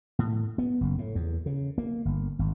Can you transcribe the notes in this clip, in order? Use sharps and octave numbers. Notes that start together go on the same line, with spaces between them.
A2
B3
F#1
A2
E2
C#3
A#3
G1
G#1